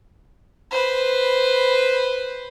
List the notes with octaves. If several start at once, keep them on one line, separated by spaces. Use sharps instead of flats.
B4 C5